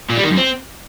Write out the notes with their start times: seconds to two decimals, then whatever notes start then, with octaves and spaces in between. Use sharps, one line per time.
0.10 A#2
0.17 G3
0.24 D#3
0.31 F#2
0.38 C4